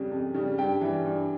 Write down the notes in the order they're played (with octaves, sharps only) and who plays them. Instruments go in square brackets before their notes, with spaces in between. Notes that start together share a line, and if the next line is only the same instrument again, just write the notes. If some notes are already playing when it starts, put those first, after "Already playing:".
Already playing: [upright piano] F2 C#3 G3
F2
C#3 G3
G2 G4 G5
E3 G3
G2